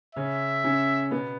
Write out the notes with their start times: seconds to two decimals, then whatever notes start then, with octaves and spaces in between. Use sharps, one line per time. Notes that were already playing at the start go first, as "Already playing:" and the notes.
0.15 C#3 C#4 E5
0.64 C#3 C#4
1.11 B2 B3